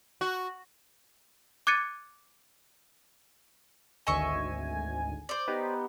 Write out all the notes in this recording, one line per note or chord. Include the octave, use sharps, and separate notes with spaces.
F#4
D6 F#6 G#6 A6 C#7 D#7
G#1 D2 D#5 E5 G#5 C#6
C5 D5
B3 D#4 G4